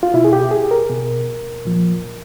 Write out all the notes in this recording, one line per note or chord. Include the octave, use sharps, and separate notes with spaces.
F4
B2 E4
G#4
G4
G#4
A#4
B2
A#2 F3